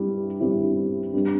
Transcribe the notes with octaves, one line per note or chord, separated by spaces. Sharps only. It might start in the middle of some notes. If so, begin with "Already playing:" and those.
Already playing: G2 G3 C4 E4
G2 G3 C4 E4
G2 G3 C4